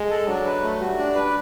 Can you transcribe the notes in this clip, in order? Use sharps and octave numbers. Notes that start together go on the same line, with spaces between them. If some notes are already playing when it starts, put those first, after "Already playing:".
Already playing: G#3
A4
F#3 D4
B4
A3
G3 F#4
D4
B4